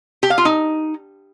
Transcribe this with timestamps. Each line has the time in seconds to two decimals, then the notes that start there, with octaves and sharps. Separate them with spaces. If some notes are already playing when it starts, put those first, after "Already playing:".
0.23 G4
0.30 F5
0.38 F4
0.45 D#4